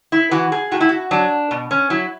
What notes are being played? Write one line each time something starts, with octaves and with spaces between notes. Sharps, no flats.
E4
E3 F#4
G#4
A2 F#4
E4
F#4
F#3 D4
B2
C#4
F#3 E4